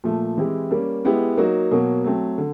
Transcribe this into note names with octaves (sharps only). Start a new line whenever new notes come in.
A#2 F3 A3
E3 G#3 C4 E4 G4
G3 A#3 C#4
G#3 B3 E4 G4
F#3 A#3 D#4 F#4
B2 F#3 A#3
F#3 A3 C4
D3